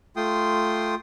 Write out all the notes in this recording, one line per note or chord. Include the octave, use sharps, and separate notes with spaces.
A3 F4 G5 C6 D#6